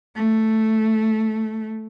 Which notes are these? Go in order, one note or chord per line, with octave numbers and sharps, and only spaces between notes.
A3